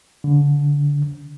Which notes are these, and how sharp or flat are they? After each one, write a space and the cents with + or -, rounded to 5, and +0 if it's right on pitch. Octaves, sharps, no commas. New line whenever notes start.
D3 -25